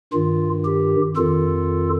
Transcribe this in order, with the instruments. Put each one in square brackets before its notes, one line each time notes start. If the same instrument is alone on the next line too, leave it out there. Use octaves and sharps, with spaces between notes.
[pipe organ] G2 D#3 F4
G4
F2 D#3 F4 A4